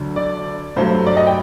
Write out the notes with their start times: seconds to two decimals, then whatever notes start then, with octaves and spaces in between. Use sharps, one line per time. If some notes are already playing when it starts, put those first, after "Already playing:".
Already playing: D2 D3 F#3
0.16 D5
0.76 G2 F#3 A3 C5
1.07 D5
1.17 D#5
1.27 G5